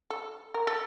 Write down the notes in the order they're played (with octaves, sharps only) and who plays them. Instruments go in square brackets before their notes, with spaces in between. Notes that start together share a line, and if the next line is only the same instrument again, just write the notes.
[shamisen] A4
A#4
A4